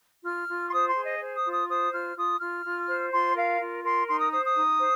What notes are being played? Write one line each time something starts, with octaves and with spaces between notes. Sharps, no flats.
F4 F6
F4
C6
C5 D#6
C6
G#4
D#5
C5
D#6
F4
D#6
C5 D#6
F4 F6
F4 D#6
F4 F6
F4
C5
F4 C6
A#4 F5
F4
A#4 C6
D#4 C6
D#6
C5 D#6
D#6
D#4
C5